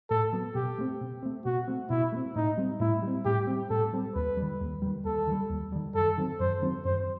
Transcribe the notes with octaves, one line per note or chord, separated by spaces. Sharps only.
A2 A4
F#3 B3
B2 G4
A3 C4
B2
A3 C4
B2 F#4
A3 C4
B2 E4
A3
C4
A2 D#4
G3 C4
A2 E4
G3 C4
A2 G4
G3 C4
A2 A4
G3 C4
D#2 B4
G3
D#3
D#2
D#3 G3
D#2 A4
D#3 G3
D#2
D#3 G3
F#2 A4
D#3 F#3 C4
F#2 C5
D#3 F#3 C4
F#2 C5